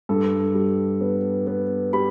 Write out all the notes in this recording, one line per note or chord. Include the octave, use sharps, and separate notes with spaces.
G2 A4
G3
B3
B3
G3 B5